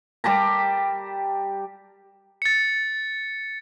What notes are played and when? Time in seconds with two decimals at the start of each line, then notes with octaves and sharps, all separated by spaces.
0.24 G3 G4 A5 A#5
2.42 A6 C#7